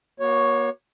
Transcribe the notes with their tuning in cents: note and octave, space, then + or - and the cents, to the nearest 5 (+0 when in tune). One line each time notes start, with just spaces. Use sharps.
A#3 +40 F#4 +0 C#5 +0